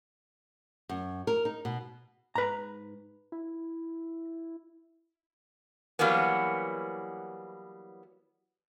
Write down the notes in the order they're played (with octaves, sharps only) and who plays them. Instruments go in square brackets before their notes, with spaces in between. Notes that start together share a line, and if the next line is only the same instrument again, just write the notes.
[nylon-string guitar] F#2
A#4
D#4
B2
[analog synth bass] G#2 [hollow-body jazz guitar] B4 A#5
[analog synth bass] E4
[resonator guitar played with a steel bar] E3 F#3 G3 A#3 B3